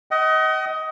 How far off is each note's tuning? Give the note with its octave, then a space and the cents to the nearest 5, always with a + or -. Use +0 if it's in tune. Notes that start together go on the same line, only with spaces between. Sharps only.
D#5 +20 F#5 +45